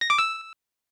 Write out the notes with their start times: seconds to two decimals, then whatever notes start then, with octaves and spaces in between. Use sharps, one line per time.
0.01 A#6
0.10 D6
0.18 E6